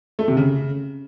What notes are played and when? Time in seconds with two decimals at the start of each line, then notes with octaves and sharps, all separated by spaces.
0.19 A3
0.28 C3
0.37 C#3